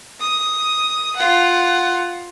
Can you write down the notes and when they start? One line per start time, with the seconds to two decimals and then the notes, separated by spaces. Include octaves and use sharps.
0.20 D#6
1.15 F4 F#5